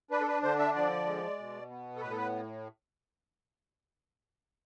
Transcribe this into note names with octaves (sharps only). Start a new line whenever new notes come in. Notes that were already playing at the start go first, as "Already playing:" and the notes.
D4 B4
A4
B4
D3 C5
E5
F3 D5
G#3
B2
B3
A4
A2 B4
A4
B4